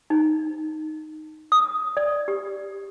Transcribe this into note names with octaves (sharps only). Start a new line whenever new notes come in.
D#4
D#6
D5
G4